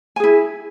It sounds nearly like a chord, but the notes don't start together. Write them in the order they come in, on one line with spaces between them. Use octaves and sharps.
G#5 G#4 E4